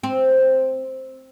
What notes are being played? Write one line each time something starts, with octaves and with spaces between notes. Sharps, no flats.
C4